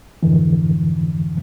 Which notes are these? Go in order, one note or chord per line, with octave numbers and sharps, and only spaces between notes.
F2 G#2 D3 E3